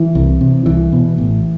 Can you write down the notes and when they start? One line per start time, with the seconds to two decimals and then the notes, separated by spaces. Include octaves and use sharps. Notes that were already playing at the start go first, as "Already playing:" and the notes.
Already playing: E3
0.15 C2
0.41 C3
0.66 C2 E3
0.93 B2
1.18 A1